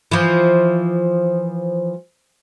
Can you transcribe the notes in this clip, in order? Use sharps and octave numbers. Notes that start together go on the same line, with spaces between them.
E3 F3